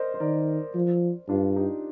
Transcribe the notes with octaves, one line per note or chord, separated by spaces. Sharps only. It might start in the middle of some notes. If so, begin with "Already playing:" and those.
Already playing: A#4 C5 D5 D#5
C5
D#3 A#4 D5
F3
G2 D4 F4
D#4 G4